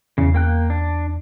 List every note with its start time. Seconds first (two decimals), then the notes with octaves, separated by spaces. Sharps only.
0.18 E2 C#3
0.34 A#3 G5 F#6
0.70 D4